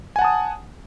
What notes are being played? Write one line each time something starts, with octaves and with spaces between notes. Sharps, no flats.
F#5 G#5 A5 D#6